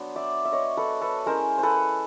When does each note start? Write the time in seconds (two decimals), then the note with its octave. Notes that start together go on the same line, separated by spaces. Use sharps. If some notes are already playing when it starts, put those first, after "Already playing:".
Already playing: F#3 B3 D4 C5
0.16 D5 E5
0.45 E5
0.52 C#5 D#5
0.77 A4 B4
1.01 A4 B4
1.26 G#3 C#4 E4 A#4 C5
1.58 C5
1.63 A4 B4